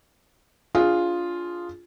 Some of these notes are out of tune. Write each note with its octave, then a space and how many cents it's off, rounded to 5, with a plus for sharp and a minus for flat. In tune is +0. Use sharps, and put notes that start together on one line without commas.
D4 -20 F4 +0 G#4 +0